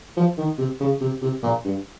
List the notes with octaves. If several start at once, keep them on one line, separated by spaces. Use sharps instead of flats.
F3
D#3
C3
C#3
C3
C3
A#2
G2